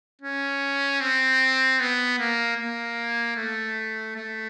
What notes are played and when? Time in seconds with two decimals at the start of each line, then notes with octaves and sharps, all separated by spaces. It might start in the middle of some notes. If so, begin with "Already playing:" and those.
0.22 C#4
1.01 C4
1.80 B3
2.19 A#3
2.58 A#3
3.36 A3
4.16 A3